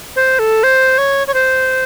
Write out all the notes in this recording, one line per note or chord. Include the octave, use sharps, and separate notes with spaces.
C5
A4
C5
C#5
C#5
C5